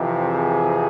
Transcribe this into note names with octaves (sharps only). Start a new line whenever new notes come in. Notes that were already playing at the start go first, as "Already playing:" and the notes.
Already playing: F2 C3 E3
G#4